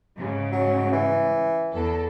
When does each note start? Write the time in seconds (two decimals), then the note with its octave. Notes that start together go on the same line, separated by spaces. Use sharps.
0.16 G#2 C#3
0.52 F#3
0.92 E3
1.73 E2 A4